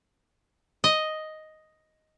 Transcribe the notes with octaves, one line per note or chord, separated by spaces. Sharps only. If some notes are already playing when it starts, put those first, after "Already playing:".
D#5